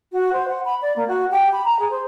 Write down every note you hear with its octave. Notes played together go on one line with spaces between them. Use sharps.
F#4
C5
F#5
B5
D5
A#3
F#4
G4
B5
A#5
G#4
C5